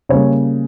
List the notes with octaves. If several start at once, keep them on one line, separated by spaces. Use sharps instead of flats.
C#3 G3 A#3 C#5